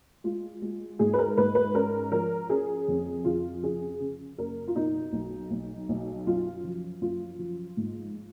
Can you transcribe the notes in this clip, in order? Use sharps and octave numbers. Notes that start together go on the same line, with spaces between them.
G#3 F4
G#3
G#2 G#4
B4
A#4
G#2 B4
B4
C#4 A#4
F3 A#4
C#4 G#4
F2
F2 F4
C#3 G#4
C#3
F#1 A#4
F4
B2 D#4
B1
B1
B1
F#2 F4
F3
F#2 F4
F3
G#2